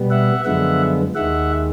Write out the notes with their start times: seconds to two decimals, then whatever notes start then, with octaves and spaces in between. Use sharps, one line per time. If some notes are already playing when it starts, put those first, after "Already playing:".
Already playing: B2 G3 B3
0.10 E5 F#5
0.45 F#2 D3 F3 G#3 B3 E5 F#5
1.15 D#2 D#3 G#3 E5 F#5